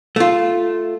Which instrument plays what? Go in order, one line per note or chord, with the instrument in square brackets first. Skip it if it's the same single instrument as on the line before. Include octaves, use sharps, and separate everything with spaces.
[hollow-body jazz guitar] A3 F4